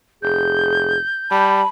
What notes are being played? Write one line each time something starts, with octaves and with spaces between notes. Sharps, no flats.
F1 G#4 G6
G3 A5 B5